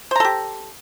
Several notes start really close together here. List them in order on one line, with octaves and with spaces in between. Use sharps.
C5 A#5 A4 G4